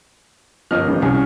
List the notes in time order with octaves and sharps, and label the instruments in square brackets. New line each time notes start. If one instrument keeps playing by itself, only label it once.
[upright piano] G1 D#5 F6 [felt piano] F3 A#4
[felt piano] A1
[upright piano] C2 C#4 [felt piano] G#5